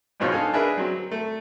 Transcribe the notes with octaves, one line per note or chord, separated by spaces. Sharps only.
F2 G#2 B2 F3 C#5 F5
D4 D#4 A4 F5 G#5
D4 G#4 A#4 B4 E5
F#3 C4
A3